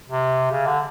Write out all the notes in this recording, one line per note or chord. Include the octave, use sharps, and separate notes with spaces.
C3
C#3
D3